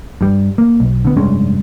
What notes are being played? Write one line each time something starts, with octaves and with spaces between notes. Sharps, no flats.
G2 G3
A#3
B1
D3 B3
F1 G2 G#3 C#4